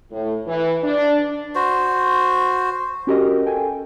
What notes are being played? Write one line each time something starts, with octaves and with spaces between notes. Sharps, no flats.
A2
E3
D4
F#4 C5
C#4 F#4 G4 A#4 D#5
A4 G5 G#5